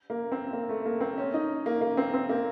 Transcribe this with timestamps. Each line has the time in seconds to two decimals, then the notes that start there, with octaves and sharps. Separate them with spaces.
0.10 A#3
0.32 C4
0.53 A#3
0.69 A3
0.85 A#3
1.01 C4
1.18 C#4
1.34 D#4
1.66 A#3
1.81 A#3
1.97 C4
2.14 C4
2.29 A#3